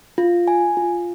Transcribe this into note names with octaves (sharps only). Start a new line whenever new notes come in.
F4
G#5
F4